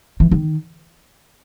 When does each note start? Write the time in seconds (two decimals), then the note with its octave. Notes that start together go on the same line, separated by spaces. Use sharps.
0.20 E3
0.31 D#3